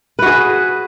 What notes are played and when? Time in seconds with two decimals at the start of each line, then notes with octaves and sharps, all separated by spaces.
0.19 B4
0.22 F#4
0.26 G#4